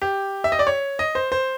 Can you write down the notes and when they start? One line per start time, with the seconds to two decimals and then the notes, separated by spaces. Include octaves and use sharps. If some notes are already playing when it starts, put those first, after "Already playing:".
0.02 G4
0.44 E5
0.52 D#5
0.59 D5
0.67 C#5
0.99 D#5
1.15 C5
1.32 C5